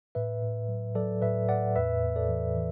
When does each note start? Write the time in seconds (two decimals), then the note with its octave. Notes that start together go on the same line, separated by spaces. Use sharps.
0.15 A2 B4 E5
0.42 A2
0.68 F#3
0.95 F#3 A4 D5
1.22 A2 B4 E5
1.48 A2 D5 F#5
1.76 E2 B4 E5
2.02 E2
2.16 A4 D5
2.29 E3
2.56 E3